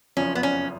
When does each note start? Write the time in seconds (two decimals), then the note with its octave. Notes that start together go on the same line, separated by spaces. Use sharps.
0.17 F#1 F2 F3 C#4
0.35 B3
0.43 C#4